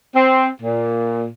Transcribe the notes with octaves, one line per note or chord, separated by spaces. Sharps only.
C4
A#2